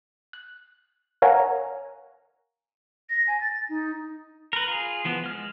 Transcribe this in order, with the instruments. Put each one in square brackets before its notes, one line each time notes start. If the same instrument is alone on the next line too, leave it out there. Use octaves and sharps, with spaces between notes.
[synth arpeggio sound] F#6
A#4 C#5 F5 F#5 G#5 A#5
[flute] A#6
G#5
A6
D#4
[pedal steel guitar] A#4 B4
F4 G#4
E3 F3 B3
G#3 F6